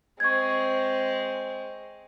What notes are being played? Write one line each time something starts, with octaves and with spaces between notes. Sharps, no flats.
G#3 C4 C#6 G#6